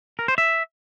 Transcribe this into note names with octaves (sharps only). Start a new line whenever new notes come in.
A#4
C5
E5